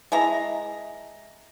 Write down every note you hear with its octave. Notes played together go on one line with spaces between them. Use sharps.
G#3 E4 A#5